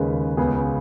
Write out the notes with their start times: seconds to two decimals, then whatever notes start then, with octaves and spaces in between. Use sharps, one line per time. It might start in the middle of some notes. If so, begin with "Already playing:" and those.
Already playing: D#2 C#3 G#3 B4
0.37 C#2 C#3 B3 G#4